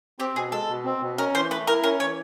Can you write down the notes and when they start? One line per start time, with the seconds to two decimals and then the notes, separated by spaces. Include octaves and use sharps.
0.19 C4 G4
0.36 B2 G#4
0.52 G#3 A4
0.69 B2
0.85 C4
1.02 B2
1.18 C#4 A#4
1.34 E3 C5
1.50 A3 B4
1.67 E4 A#4
1.83 C#4 A#4
2.00 E3 C#5